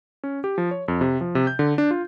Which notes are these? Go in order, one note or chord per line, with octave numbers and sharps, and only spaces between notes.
C#4
G4
F3
C#5
F2
C3
F3
C3
G6
D3
D4
F4